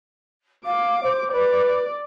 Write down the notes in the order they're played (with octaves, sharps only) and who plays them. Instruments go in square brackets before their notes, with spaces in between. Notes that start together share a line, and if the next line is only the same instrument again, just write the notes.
[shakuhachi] F5 [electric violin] D6
[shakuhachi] C5
[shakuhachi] B4 [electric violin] D5